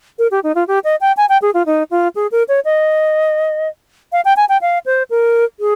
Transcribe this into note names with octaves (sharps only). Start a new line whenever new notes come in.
A#4
G4
D#4
F4
G4
D#5
G5
G#5
G5
G#4
F4
D#4
F4
G#4
A#4
C#5
D#5
F5
G5
G#5
G5
F5
C5
A#4
G#4